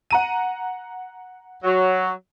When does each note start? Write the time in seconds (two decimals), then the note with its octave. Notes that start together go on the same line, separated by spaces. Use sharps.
0.11 F#5 A#5 D#7
1.63 F#3